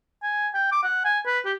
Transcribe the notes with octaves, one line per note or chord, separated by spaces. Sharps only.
G#5
G5
D6
F#5
G#5
B4
G4